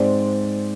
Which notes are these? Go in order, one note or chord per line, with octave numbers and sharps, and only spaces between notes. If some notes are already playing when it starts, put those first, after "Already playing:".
Already playing: G#2 G#3 C4 D5